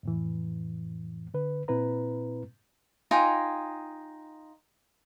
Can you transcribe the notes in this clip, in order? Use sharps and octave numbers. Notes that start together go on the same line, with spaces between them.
F2 A2 E3
D3 B4
A#2 C4 E4 B4 A#5
D#4 F4 G5 G#5